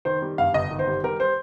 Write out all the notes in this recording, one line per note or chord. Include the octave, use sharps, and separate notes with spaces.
D#3 C5
G3
G2 F5
G1 D#5
D#3
C5
G3
G3 A#4
C5